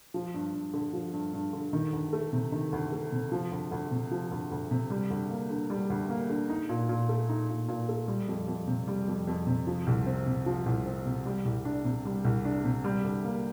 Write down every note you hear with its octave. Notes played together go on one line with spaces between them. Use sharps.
F3
G2
G2
D3
F3
G2
G2
D3
D#3
D2
A3
C3
D#3
D2
A3
C3
F3
D2
D2
C3
F3
D2
D2
C3
G3
D2
A#3
D3
G3
D2
A#3
D3
D#4
A#2
A#2
A3
D#4
A#2
A#2
A3
G3
F2
F2
C3
G3
F2
F2
C3
F3
C2
C4
C3
F3
C2
C4
C3
G3
C2
D4
C3
G3
C2
D4
C3
G3
D2
A#3